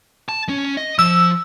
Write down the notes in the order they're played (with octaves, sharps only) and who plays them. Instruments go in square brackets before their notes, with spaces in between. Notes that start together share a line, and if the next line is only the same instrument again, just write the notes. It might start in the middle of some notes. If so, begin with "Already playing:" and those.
[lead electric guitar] A5
C#4
D#5
[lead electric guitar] F3 [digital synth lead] E6